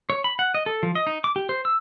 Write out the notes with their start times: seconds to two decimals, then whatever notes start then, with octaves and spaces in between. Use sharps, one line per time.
0.10 C#5
0.24 B5
0.39 F#5
0.54 D#5
0.66 A4
0.83 F3
0.95 D#5
1.07 D#4
1.24 D6
1.36 G4
1.49 C5
1.65 E6